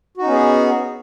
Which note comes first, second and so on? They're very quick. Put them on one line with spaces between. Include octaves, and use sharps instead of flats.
F#4 D#4 C#4 B3 G#4